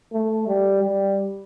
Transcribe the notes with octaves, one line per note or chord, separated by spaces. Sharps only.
A3
G3
G3